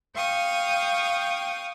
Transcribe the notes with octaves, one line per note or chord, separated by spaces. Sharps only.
F5 G5 C#6 D#6